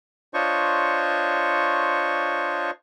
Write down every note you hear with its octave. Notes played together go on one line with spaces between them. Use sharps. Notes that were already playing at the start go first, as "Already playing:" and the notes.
D4 F4 C5 C#5 D#5 C#6